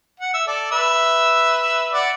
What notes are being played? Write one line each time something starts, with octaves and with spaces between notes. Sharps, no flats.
F#5
E5
A4 D5
B4 E5
D5 F#5